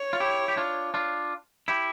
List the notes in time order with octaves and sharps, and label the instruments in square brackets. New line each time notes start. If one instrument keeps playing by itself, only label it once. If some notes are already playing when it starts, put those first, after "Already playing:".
Already playing: [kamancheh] C#5
[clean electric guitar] F4
E4 G4
G4
D4 F4
D4 F4
E4 G4